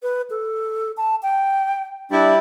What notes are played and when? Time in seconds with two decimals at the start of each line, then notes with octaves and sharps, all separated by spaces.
0.03 B4
0.30 A4
0.97 A5
1.23 G5
2.10 G3 D4 E4